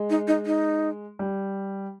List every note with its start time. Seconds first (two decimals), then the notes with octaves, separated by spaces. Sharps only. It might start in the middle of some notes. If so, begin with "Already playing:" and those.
Already playing: G#3
0.10 D#4
0.27 D#4
0.46 D#4
1.19 G3